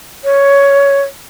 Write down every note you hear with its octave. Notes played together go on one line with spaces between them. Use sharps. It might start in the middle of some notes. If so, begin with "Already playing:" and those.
C#5